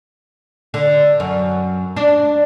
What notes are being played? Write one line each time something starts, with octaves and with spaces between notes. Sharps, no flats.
D3
F#2
D4